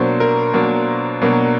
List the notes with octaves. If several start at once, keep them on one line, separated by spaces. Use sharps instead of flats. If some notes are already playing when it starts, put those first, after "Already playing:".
Already playing: B2 F#3 A#3 D4 C5
A#4
B2 F#3 A#3 D4
B2 F#3 A#3 D4